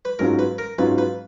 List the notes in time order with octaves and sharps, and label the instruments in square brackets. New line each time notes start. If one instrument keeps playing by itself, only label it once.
[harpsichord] B4
[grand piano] G#2 F#3 C#4 F4 [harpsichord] A#4
[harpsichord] B4
A#4
[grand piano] G#2 F#3 C#4 F4 [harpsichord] B4
[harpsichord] B4